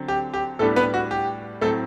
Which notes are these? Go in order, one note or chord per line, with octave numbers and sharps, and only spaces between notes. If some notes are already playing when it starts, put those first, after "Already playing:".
Already playing: D3 F#3 C4
G4
G4
A2 G3 A3 B3 D4 A4
B3 B4
F#4
G4
A2 F#3 A3 C4 A4